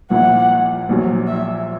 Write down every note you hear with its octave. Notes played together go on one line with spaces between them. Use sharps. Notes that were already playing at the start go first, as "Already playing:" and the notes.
A#1 A#2 A#3 E4 F#5
A#1 A#2 F#3
E5